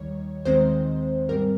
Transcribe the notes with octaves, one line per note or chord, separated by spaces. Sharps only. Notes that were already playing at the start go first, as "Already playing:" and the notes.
Already playing: D#2 D#3 G3 C#5
D#2 D#3 G#3 C4 C5
G#2 G3 C4 A#4